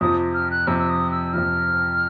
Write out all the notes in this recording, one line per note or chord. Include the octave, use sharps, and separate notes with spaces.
F2 C3 F3 D#6
F6
F#6
F2 C3 F3 E6
E6
D#6
E6
F2 C3 F3 F6